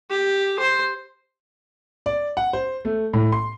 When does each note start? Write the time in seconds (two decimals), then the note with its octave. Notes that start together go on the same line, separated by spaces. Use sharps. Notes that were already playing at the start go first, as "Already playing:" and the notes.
0.10 G4
0.59 C5
2.06 D5
2.37 F#5
2.53 C5
2.85 A3
3.13 A2
3.32 C6